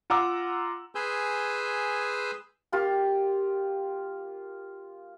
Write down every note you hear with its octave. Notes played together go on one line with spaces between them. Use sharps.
F4 F#5 A#5 D6 E6
G#4 B4 G#5 C6 E6 G6
A#3 F4 G4